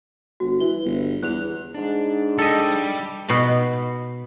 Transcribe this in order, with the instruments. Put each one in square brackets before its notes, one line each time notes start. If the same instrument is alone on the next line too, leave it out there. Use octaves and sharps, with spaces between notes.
[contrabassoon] G1 [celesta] F#4
[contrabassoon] E3 [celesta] G7
[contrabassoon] G1
[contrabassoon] E2 [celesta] F#6 F7
[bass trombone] G#2 [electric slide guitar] D4
[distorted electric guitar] G3 [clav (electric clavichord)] A4 D#5
[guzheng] B2 B5